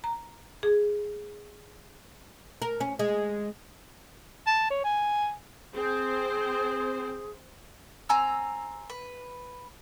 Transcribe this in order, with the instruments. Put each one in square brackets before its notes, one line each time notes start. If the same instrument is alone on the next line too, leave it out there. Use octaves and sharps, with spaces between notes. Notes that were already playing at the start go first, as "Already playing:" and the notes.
[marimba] A#5
G#4
[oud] A#4
C#4
G#3
[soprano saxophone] A5
C#5
G#5
[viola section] C4 C5 [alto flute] G#4
[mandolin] C4 G#5 A#5 E6
B4